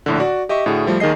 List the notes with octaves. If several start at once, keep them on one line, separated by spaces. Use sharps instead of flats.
A#1 A2 D3
F#4 D5
G4 D#5 E5 C#6
A2 D3 F#4 G#4
F3 G3 A3
D#2 D#3 G#4 D#5 C7